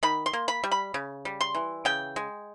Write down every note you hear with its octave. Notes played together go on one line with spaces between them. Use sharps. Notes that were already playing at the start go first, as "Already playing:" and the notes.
D#3 B5
C6
A#3
B5
G3
B5
C#3
G3
C6
E3
C#3 G5
G#3